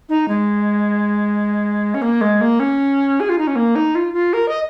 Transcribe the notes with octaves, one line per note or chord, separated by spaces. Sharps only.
D#4
G#3
C#4
A#3
G#3
A#3
C#4
G#4
F4
D#4
C#4
A#3
D#4
F4
F4
A#4
D#5